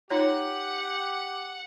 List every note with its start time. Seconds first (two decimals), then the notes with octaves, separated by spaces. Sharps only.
0.10 D#4 F4 G4 C#5 F#5